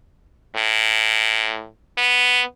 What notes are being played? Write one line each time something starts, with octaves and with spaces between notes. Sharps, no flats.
A2
B3